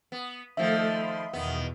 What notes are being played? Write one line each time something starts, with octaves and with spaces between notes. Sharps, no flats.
B3
D#3 F3 A3 A4 E5 A5
B5 C6
E2 B2 D#3 B3